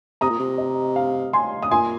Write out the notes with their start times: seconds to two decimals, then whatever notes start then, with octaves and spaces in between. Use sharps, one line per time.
0.21 C3 A#5 D#6
0.30 A#2
0.39 C3
0.58 D#5
0.96 F5
1.33 G#5 C6
1.63 D#6
1.71 A#2 G#5 C6